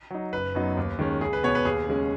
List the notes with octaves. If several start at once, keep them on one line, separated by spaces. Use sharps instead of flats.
F#3 D#4
F#1 B4
F#2 F#3 B3 D#4
D#2
D#3 G#3 C#4
C#2 G#4
B4
B2 B3 C#5
B4
D#2 G#4
C#3 G#3 C#4